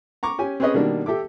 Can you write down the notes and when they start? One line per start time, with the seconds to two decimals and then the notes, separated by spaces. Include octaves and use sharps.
0.23 A#5 C#6 D6
0.39 C#4 G4 G#5
0.60 C4 C#4 G#4 B4 C#5 D#5
0.74 B2 D#3 G3 A#3 D4
1.06 G4 A4 E5 D6